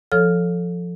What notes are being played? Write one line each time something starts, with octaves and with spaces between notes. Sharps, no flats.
F3 A4 C#5 F6